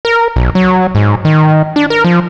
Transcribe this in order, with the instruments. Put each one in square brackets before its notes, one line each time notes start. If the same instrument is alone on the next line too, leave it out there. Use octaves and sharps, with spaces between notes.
[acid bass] A#4
B1
F#3
G#2
D#3
D4
A#4
F3